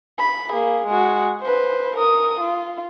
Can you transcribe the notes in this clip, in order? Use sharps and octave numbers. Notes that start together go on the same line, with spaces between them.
B5
A#3 G#4
G#3 F#4
B4 C5
A#4 D#6
F4